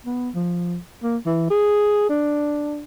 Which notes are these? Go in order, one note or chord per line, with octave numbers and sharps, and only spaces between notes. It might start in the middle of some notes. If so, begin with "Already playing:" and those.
B3
F3
A#3
E3
G#4
D4